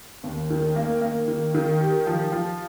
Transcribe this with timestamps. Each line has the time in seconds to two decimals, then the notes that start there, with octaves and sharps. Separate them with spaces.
0.23 D#2
0.50 D#3
0.76 A#3
1.01 A#3
1.28 D#3
1.55 D#3
1.81 G4
2.07 F3
2.32 F3